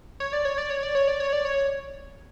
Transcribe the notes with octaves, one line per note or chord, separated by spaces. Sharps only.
C#5
D5
C#5
D5
C#5
D5
C#5
D5
C#5
D5
C#5